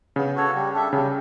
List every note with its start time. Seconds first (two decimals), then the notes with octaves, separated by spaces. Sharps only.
0.16 C#3 B3
0.36 F#4 A4 C#5
0.54 G3
0.74 D4 A4 E5
0.92 C#3 G3